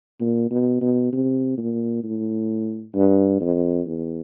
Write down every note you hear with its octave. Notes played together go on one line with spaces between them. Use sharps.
A#2
B2
B2
C3
A#2
A2
G2
F2
E2